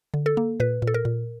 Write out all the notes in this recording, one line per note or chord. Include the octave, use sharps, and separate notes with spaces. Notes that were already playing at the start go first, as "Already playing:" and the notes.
D3
A4
A#3
A#2 B4
A#2
A4
A#4
A#2